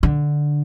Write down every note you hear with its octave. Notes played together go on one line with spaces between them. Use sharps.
D3